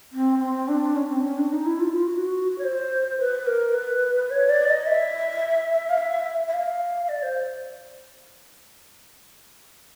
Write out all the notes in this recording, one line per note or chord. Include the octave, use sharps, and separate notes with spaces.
C4
C4
D4
C#4
C4
C#4
D4
D#4
E4
F4
F4
F#4
C#5
C5
B4
A#4
B4
C#5
D5
D#5
E5
F5
E5
E5
F5
D5
C5